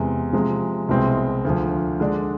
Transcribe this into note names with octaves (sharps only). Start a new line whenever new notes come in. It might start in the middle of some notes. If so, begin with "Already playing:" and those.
Already playing: E2 C3 G#3
C3 F3 G#3
C2 B2 G#3 C4 E4
D2 D3 F3
D3 G#3 D4